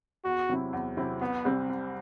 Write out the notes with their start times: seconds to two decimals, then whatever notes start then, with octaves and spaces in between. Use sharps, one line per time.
0.24 E2 F#4
0.49 C3 F#3 C4 E4
0.73 E2
0.97 C3 F#3 C4 E4
1.21 C2 B3
1.45 C3 G3 C4 G4
1.69 C2